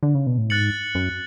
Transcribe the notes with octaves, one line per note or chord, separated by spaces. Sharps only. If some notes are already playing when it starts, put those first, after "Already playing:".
D3
C#3
B2
A2
G#2 F#6 A6 C#7 F#7
F#2